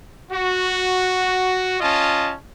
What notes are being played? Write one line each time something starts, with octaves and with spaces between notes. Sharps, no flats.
F#4
C#4 F4 D#5 A5